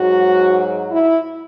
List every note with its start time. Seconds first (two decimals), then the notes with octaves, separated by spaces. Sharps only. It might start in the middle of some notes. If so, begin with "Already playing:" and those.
Already playing: G#2 F#3 F#4
0.91 E4